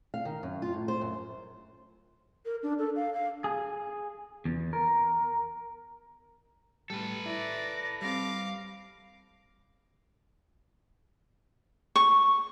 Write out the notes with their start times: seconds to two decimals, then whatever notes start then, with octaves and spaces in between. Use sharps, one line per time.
0.14 F5
0.25 D#3
0.43 F#2
0.62 F4
0.74 A2
0.88 C5
1.01 F#2
2.45 A#4
2.63 D4
2.79 A4
2.96 F5
3.13 F5
3.44 G#4
4.45 E2
4.73 A#4
6.90 A2 G3 A4 B4
7.26 E4 D5 A#6
8.02 G3 C4 F5 D6
11.96 C#6